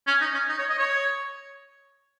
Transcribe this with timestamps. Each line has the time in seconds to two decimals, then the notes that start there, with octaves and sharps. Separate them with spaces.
0.07 C#4
0.21 D#4
0.34 C#4
0.49 D#4
0.59 C#5
0.69 D#5
0.79 C#5